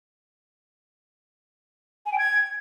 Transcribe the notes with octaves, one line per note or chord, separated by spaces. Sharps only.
G#5
G5
G#6